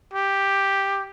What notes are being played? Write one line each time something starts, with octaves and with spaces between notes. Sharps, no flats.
G4